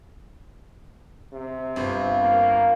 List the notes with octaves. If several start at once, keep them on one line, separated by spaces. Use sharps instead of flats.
C3
G1 F3 C4 F4 B5
A#3